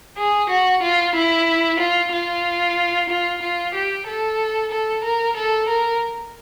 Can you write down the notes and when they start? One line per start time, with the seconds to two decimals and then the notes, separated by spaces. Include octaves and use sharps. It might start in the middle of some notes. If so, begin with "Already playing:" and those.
0.17 G#4
0.50 F#4
0.83 F4
1.15 E4
1.80 F4
2.12 F4
3.09 F4
3.42 F4
3.74 G4
4.07 A4
4.71 A4
5.04 A#4
5.36 A4
5.69 A#4